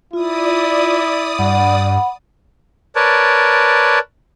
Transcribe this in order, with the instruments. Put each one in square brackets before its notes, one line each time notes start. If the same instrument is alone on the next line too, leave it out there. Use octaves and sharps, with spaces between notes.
[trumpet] E4 [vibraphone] F4 [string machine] D5 D#6
[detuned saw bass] G2 [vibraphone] F#5 B5
[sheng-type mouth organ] A#4 B4 C#5 D5 A5